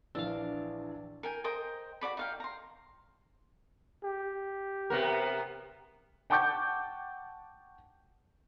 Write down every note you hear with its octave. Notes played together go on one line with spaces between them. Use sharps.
A#1 E3 D4 F5 E6
A#4 G5 G#5
A#4 C5 D#5 G5
F#4 A4 D5 B5
D#4 F5 G5
A#5 C6
G4
C3 B3 A#4
F#5 G5 A5 C#6 D6 G6